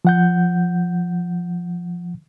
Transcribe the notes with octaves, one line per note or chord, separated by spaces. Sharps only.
F3 F#5 G6